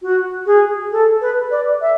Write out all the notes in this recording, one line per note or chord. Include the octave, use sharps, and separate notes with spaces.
F#4
G#4
A4
B4
D5
E5